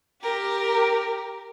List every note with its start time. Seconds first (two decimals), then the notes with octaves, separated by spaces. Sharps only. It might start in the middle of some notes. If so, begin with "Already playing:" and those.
0.22 G4 A#4